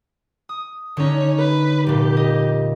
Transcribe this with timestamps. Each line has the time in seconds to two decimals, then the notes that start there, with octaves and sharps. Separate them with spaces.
0.49 D#6
0.97 D3 C#4 D#4 C#5
1.38 B4
1.87 F1 A#2 G4
2.17 D#5